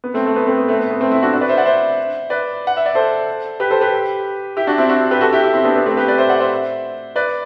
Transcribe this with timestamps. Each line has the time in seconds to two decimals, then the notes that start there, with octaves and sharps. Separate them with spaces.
0.04 B3
0.14 A3 C4
0.26 A3
0.36 B3
0.47 A3 C4
0.58 B3
0.68 A3 C4
0.79 B3
0.90 B3
1.01 A3 C4
1.11 C4 E4
1.22 D4 F#4
1.33 D4 F#4
1.41 B4 D5
1.49 C5 E5
1.57 D5 F#5
1.65 C5 E5
2.30 B4 D5
2.67 F#5
2.77 E5
2.86 D5
2.95 A4 C5
3.60 G4 B4
3.70 A4 C5
3.81 G4 B4
4.57 E4 G4
4.67 D4 F#4
4.78 C4 E4
4.89 D4 F#4
5.11 G4 B4
5.21 F#4 A4
5.32 E4 G4
5.43 E4 G4
5.54 C4 E4
5.65 B3 D4
5.75 B3 D4
5.86 A3 C4
5.97 G4 B4
6.08 B4 D5
6.18 C5 E5
6.29 D5 F#5
6.40 C5 E5
7.16 B4 D5